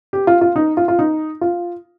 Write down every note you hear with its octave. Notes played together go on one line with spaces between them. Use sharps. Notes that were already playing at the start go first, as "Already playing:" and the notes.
G4
F4
F4
D#4
F4
F4
D#4
F4